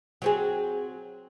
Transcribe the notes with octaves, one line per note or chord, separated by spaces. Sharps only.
F#3 C4 G#4